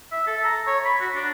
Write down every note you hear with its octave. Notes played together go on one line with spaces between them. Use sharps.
E5
A4
A#5
C#5
B5
F#4
D4